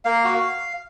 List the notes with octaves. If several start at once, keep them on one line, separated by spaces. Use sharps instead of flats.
A#3 F5
F#4